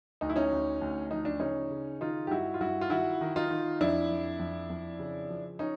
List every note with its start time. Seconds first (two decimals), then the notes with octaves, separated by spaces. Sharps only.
0.21 D2 D#4
0.30 E4
0.36 C#4 D#4
0.52 D2
0.81 D2
1.11 F3 D#4
1.25 D4
1.40 C#3 C#4 D#4
1.70 C#3
2.00 D#3 D#4 F4
2.27 G4
2.30 G2 E4 F#4
2.54 F4
2.61 G2 E4 F#4
2.81 F4
2.90 D#3 E4 F#4
3.21 D#3
3.36 D#4 F4
3.51 D#3
3.81 F2 D4 E4
4.10 F2
4.39 F2
4.70 F2
4.99 C#3
5.30 F3
5.59 C#4 D#4